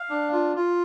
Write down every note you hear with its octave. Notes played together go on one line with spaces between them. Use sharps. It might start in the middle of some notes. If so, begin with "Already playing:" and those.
Already playing: F5
D4
F4
F4